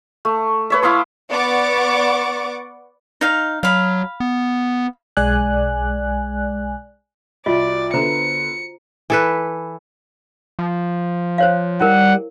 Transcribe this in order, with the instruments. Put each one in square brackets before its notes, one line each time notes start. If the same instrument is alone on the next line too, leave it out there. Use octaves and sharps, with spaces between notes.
[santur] A3
B4 C#5 E5
E4 F5 C6 D#6
[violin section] B3 D5 F#5 C#6 D6 A6
[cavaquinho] D#4 F5
[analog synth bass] F#3 [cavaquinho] F5 B5
[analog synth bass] B3
[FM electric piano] B1 G#3 D5 G#5 F#6
[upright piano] C2 [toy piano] F4 F#4 D#5 [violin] D5
[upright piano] D3 B3 [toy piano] C5 A#5 [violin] C#7
[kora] E3 A4 B4
[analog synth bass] F3
[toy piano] C5 C#5 F5
[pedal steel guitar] G3 [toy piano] E4 A#4 [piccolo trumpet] F#5